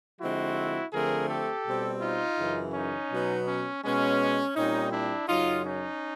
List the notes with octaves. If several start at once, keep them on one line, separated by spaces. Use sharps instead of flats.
D3 F3 G#3 C4 E4 F#4
D3 F3 A3 C4 G#4 A#4
G4 A4
B2 G3 C4
D#4 F4
F#2 C#3 E3
C#4 D#4
B2 F#3 B3
C#4
B2 G#3 B3 C#4
A#2 G3 C4 C#4 D#4
D4 E4
F#2 C#3 F#3 D#4 F4
C#4 D#4